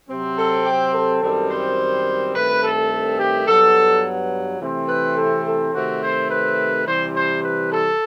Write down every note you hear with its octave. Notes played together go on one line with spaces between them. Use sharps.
C3 F#3 C4
A4
G4
A4
F#2 D#3 G3 C4
C5
G2 D#3 A3 C4 B4
A4
G4
G2 F#3 B3 A4
C3 E3 A3 C4
B4
A4
A4
C3 D#3 A3 C4 F#4
C5
B4
C3 E3 G3 C4 C5
C5
B4
A4